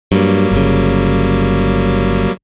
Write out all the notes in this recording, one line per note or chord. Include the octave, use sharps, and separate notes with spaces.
G2 F#3 G3 A#3
G1 C#3